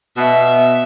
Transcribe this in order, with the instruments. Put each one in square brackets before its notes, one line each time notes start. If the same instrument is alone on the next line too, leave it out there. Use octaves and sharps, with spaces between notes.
[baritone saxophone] B2 [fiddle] E5